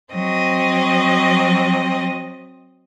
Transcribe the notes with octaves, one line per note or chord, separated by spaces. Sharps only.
F#3 C4 D#5